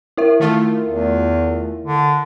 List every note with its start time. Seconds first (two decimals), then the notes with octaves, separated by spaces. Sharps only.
0.17 E4 A#4 E5
0.40 D#3 A3 F4
0.87 E2
1.85 D3